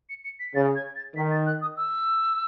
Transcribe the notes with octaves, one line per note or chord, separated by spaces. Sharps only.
C#7
C#7
B6
C#3 A6
G#6
A6
D#3 B6
A6
F#6
D#6
E6